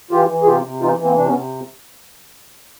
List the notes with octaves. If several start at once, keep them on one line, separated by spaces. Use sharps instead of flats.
E3 F4 G4
E3
G#4
C3 F4 G4
C3
E3 D#4 F4
E3
A#3 C4
C3 D4
B3 C#4
C3